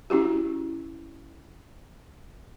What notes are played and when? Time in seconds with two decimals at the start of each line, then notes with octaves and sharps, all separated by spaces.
0.10 C#4 E4 F#4 G4